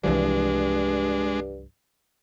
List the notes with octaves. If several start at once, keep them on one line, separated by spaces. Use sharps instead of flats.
C2 G2 E3 F3 G#3 D4